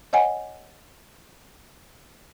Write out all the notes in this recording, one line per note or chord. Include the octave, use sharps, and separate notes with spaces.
C#5 D#5 F#5 G#5